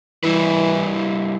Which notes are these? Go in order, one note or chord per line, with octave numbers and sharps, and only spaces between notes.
E3 G3 E4 B4